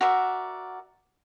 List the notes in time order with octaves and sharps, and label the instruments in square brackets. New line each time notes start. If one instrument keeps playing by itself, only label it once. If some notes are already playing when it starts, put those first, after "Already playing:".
[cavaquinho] F#4 A#4 D5 E5